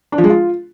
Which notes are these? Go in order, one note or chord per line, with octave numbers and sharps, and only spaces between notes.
D4
F3
G#3
F4